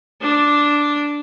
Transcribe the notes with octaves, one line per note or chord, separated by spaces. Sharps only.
D4